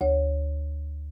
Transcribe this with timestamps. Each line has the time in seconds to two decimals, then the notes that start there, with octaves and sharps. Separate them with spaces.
0.01 D2 C#5